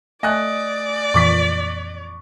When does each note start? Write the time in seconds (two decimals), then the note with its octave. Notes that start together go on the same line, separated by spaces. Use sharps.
0.23 A3 D5 D#5 G#5 F#6
1.14 F2 A#2 E3 C#6 D6 B6